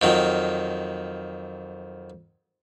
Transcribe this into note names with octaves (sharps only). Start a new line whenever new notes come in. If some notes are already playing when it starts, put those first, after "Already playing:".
F2 D#3 F#3